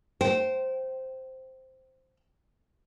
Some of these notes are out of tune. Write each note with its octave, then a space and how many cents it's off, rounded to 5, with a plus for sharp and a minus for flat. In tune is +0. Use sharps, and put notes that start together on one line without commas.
C5 +0 G5 -25